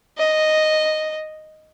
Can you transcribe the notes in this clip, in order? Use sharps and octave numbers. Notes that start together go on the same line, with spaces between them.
D#5